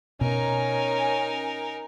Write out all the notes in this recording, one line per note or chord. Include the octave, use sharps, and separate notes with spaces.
B2 C#4 D#4 A#4 G#5